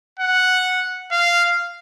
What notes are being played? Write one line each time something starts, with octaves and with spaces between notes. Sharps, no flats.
F#5
F5